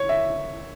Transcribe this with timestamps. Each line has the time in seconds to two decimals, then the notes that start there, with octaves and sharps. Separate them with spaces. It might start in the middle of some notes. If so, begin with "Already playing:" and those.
Already playing: C#5
0.09 E5